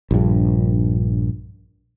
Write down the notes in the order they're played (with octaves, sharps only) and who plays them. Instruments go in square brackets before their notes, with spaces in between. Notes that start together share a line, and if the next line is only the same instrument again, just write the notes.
[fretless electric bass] A#1 G2